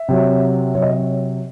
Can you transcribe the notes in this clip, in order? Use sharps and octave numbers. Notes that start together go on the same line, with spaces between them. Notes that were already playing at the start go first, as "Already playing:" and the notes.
Already playing: E5
C3 F#3
C3 F#3 C#5
D#5
C#5